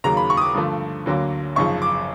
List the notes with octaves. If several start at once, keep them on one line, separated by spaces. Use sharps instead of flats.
D#2 C#3 F#3 A#3 A#5
B5
C#6
D#6
D6
G2 D3 F3 A3
D2 D3 F#3 A#3
G#1 F#2 C#3 F3 C#6
D6